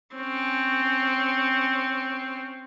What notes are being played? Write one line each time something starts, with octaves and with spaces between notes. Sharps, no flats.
C4 C#4